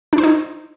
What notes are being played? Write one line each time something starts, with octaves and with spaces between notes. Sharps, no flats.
D4
C5
D#4